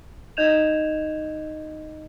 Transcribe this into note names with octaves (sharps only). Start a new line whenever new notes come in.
D#4 D#5 G6 G#6 E7 F7